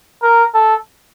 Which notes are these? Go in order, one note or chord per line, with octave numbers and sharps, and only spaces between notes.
A#4
A4